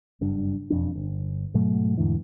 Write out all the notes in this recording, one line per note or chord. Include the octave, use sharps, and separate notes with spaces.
F#1 G2 D4
E1 F2 D4
G1
G#2 B2 F#3 A3
E2 G#2 D3 E3